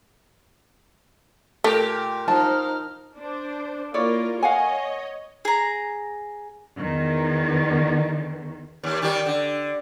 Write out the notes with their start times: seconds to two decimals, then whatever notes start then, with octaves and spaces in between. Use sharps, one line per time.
1.64 A#2 A3 G4 A#4
2.28 F3 D#4 A5 F6
3.17 D4 C5
3.94 A#3 E4 F4 A#4 C#5 D5
4.43 C#5 D#5 F5 F#5 G#5
5.45 G#4 A#5
6.78 E2 D#3
8.84 D#2
9.02 D#3 G3
9.26 D3